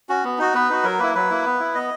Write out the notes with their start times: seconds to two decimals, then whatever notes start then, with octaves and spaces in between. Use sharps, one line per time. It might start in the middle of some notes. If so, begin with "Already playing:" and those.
0.09 C#4 F#4
0.24 B3
0.38 D#4 F#4
0.54 B3 B4
0.70 D#4 F#4
0.84 F#3 A#4
0.99 A#3 E4 B4
1.15 F#3 B4
1.30 A#3 E4
1.45 B3
1.60 E4
1.75 B3 D#5